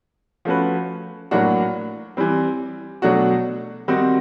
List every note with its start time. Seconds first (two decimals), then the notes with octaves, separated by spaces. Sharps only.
0.45 F3 A3 C#4 F#4 B4
1.31 A2 F#3 A#3 D4 F#4
2.17 E3 G3 C4
3.02 B2 F#3 A3 D4 F#4
3.88 D#3 G3 C4 D#4 F#4